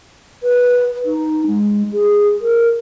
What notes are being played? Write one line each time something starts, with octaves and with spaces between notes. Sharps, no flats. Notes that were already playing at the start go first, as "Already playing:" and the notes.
B4
D#4
G#3
G#4
A#4